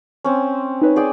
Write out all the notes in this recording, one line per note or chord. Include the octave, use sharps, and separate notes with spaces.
C4 C#4
D#4 B4 C#5
G#4 D5 G5